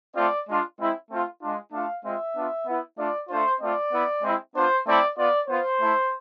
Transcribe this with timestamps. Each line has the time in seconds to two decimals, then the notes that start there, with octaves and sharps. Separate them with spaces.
0.15 A3 C4 F4 D5
0.47 G#3 D4 F4
0.78 G#3 C4 E4
1.09 A3 C4 F4
1.41 G#3 D4 F4
1.72 A3 D4 F4 F5
2.03 G#3 C4 F4 E5
2.35 B3 D4 F4
2.66 B3 E4
2.97 A3 D4 F4 D5
3.28 A3 D4 F4 C5
3.60 A3 C4 F4 D5
3.91 B3 E4
4.23 G#3 C4 E4
4.54 B3 D4 F4 C5
4.85 A3 C4 E4 D5
5.16 B3 F4 D5
5.48 B3 F4 C5
5.79 A3 E4